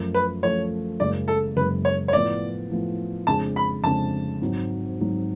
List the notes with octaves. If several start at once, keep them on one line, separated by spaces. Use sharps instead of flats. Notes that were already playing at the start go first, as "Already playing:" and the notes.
Already playing: F#2 F3 A3
B4
F#2 F3 A3 C#5
F#1 F#2 C#3 G#3 D5
A4
F#1 F#2 C#3 G#3 B4
C#5
C#5
A2 F3 B3 D5
A2 F3 B3
F2 C#3 G#3 D4 G#4 A5
B5
F2 C#3 G#3 D4 G#4 A5
G#1 G#2 F#3
G#1 G#2 F#3